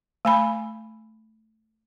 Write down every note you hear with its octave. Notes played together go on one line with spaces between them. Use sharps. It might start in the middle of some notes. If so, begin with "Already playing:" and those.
A3 G#5 B5